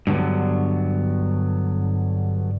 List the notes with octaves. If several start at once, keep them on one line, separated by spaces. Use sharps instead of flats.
G2 D3 F#3 B3